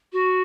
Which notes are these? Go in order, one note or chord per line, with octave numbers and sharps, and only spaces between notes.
F#4